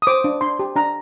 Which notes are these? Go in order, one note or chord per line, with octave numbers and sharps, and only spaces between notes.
D#6
C5 D6
D4
D4 C6
G4
D4 A#5